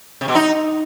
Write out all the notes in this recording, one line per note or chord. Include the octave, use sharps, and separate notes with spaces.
C3
B2
D#4